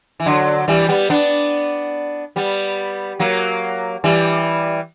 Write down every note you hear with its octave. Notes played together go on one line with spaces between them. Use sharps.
E3
D3 F#3
E3 G3
G3 B3
B3 D4
G3 B3
F#3 A#3
E3 G3